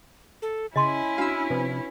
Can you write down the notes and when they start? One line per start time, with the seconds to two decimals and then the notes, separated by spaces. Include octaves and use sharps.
0.42 A4
0.76 C#3 C#4 E4 D#5 G#5 C6
1.18 D4 F#4 F5 E6
1.50 C3 F3 B4